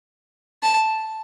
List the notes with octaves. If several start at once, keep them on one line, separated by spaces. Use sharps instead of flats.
A5